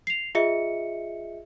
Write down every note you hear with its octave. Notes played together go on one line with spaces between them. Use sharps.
C7 F7
F4 G#4 D#5 E5 C#7